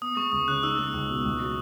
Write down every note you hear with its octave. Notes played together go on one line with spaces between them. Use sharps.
B3 D#6
G#3 C#6
C#2 D#6
C#3 F#6
D#4 E6
G#3
C#2
B2
C#2
F#3